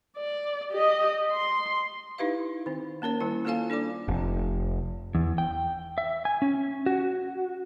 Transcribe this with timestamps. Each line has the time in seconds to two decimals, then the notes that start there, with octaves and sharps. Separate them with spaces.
0.18 D5
0.71 G4 D#5
1.32 C6
2.18 D#4 E4 G4 B4 E5 F5
2.66 D#3 C4
3.02 A#3 C#4 A#4 C#5
3.20 D#3 G3 E4 G#5
3.45 A#3 F4 A4 C#5 F5 G#5
3.70 D4 A4 D5 D6
4.08 F1
5.15 E2
5.38 G5
5.98 E5
6.25 G#5
6.42 C#4
6.86 F#4